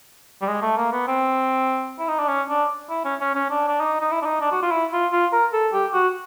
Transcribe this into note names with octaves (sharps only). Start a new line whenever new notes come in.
G3
G#3
A3
A#3
B3
C4
E4
D#4
D4
C#4
D4
E4
C#4
C#4
C#4
D4
D4
D#4
D#4
E4
D4
D#4
D4
F#4
F4
E4
F4
F4
A#4
A4
G4
F#4